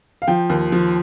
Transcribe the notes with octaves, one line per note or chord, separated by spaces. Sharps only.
F5
F3 G5
D#2
F3